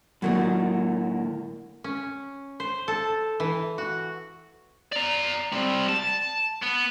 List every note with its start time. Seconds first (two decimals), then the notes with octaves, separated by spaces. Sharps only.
0.22 A2 D3 D#3 F#3 A#3
1.84 C#4
2.60 C5
2.88 A4
3.40 E3
3.78 F#4
4.92 D5 A#5
5.52 G3 C4
5.89 A5
6.62 B3